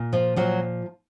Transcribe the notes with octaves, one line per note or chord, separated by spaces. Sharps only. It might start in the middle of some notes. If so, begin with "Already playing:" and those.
Already playing: A#2
F3 F4
A#2 F3 F#3 F#4